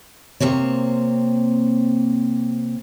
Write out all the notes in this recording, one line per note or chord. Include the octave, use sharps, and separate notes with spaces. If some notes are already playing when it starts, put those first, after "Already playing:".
C3 A#3 C4 C#5